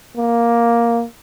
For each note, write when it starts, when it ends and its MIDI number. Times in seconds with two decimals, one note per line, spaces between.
0.17 1.03 58